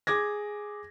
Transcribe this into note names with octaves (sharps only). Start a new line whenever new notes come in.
G#4 D6 G#6 A#6